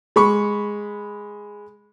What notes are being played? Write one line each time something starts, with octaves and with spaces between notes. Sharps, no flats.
G#3 B5 C#6